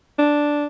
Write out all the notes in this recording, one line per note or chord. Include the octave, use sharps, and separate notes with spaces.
D4